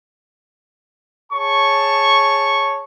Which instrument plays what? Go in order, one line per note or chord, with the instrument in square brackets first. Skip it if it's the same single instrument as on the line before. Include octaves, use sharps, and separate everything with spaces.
[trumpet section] G#4 C#5 A5 C#6